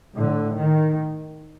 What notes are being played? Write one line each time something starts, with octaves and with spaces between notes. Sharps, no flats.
A2 D3
D#3